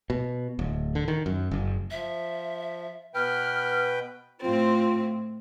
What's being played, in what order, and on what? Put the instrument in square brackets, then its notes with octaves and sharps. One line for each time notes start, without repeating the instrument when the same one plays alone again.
[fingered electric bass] B2
D1
D3
D#3
F#2
F#1
[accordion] F3 [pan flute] E5
[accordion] B2 B4 G5 [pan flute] F6
[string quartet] A2 C4 [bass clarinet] F4